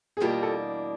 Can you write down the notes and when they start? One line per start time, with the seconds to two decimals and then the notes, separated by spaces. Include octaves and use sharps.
0.17 G#4
0.20 E2 B2 G3 A#3 D4 F4 G4
0.43 A4